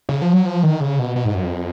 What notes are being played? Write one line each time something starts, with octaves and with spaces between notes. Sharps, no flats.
C#3
F3
F#3
F3
D#3
C#3
B2
B2
G#2
F#2
F2